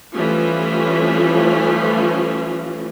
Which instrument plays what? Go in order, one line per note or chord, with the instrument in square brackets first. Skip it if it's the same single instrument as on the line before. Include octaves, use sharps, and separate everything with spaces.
[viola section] E3 F3 G3 A3 C#4 F4